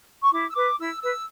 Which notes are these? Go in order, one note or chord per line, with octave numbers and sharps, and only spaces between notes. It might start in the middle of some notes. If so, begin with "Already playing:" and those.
C#6
E4 D6
E6
B4 D6
E4 E6
B4 E6